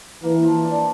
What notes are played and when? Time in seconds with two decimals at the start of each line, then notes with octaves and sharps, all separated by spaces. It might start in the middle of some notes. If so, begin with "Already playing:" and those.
0.23 E3 A#3
0.44 F3
0.64 D4